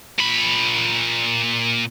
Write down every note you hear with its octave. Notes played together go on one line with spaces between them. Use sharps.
A#2 B5